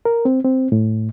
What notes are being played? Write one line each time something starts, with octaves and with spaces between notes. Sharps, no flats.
A#4
C4
C4
A2